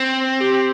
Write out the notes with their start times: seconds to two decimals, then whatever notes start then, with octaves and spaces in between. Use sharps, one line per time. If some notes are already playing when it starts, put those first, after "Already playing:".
Already playing: C4
0.40 G4